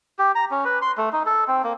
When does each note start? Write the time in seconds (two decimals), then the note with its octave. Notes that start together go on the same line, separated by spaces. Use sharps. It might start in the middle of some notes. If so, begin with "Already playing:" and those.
0.19 G4
0.35 A#5
0.51 C#4
0.65 B4
0.82 C6
0.97 A3
1.13 D#4
1.26 A4
1.48 C4
1.64 A#3